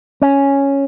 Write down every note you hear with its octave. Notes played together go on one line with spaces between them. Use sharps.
C#4